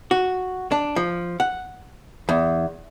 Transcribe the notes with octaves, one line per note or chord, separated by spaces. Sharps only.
F#4
D4
F3
F#5
E2